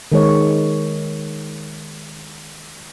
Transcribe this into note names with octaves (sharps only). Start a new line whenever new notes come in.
D#3 G#3 C#5